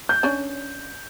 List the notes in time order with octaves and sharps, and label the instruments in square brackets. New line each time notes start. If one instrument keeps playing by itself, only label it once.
[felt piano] G6
[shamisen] C#4 D4